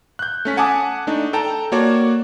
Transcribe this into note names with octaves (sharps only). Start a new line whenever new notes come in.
F#6 G6
A3 C#4 B6
F#5 G#5 A5 D6 D#6
A3 D4 D#4
A4 G5 A5 A#5
A#3 F#4 C#5 D5